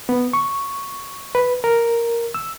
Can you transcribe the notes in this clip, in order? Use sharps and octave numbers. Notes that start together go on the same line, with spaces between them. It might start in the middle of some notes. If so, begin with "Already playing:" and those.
B3
C#6
B4
A#4
E6